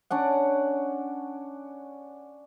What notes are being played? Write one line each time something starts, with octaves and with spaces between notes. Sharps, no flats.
C#4 D4 F#5